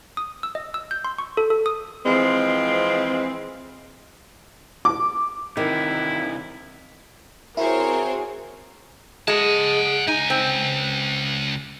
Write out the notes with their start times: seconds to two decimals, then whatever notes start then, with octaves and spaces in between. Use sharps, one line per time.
0.17 D#6
0.43 E6
0.55 D#5
0.74 E6
0.91 G6
1.04 C6
1.18 C#6
1.37 A4
1.50 A4
1.66 D#6
2.06 E3 F3 G#3 C4
4.85 D6
5.57 C3 D#3 E3 E4
7.57 C4 E4 F#4 G#4 A#4 C5 C#5
9.28 G#3 F#5 A5
10.07 C#2 D#4 G#5
10.30 C4